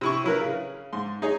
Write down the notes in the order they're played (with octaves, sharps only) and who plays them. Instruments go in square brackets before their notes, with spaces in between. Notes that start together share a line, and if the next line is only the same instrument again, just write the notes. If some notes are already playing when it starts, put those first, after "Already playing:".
[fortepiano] C3 E4 C#6
F#3 E4 A#4 B4
C#3
G#2 C6
D#4 G#4 C#5